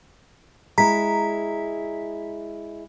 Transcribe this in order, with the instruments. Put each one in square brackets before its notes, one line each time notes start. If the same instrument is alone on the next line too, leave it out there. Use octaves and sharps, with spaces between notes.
[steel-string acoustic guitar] G#3 E4 [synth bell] A#5 B6